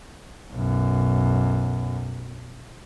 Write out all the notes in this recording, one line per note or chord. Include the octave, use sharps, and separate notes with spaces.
B1 F#2